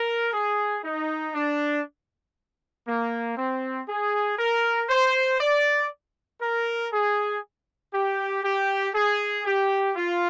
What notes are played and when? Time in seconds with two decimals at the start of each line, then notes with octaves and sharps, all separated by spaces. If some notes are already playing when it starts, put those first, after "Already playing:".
Already playing: A#4
0.33 G#4
0.84 D#4
1.35 D4
2.87 A#3
3.37 C4
3.88 G#4
4.38 A#4
4.90 C5
5.41 D5
6.41 A#4
6.93 G#4
7.94 G4
8.44 G4
8.95 G#4
9.46 G4
9.96 F4